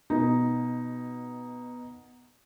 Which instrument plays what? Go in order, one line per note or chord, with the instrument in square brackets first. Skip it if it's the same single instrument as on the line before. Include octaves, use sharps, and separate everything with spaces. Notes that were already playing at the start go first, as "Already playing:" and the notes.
[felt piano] B2 D#4